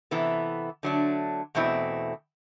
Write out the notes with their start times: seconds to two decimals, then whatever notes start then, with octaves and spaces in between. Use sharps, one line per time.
0.11 C3 E3 B3 E4 A4
0.83 D3 F#3 A3 D4
1.55 E2 B2 A3 C4 E4